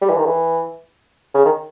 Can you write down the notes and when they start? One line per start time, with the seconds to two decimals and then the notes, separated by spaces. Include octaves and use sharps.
0.01 G3
0.10 E3
0.17 D#3
0.26 E3
1.34 C#3
1.45 D#3